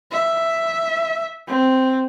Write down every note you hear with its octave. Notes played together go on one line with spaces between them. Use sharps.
E5
C4